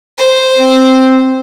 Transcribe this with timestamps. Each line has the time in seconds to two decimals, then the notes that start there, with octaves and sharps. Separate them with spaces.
0.18 C5
0.56 C4